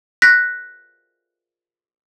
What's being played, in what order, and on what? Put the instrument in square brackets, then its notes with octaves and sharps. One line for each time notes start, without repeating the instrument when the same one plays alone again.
[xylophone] F#6 A#6 B6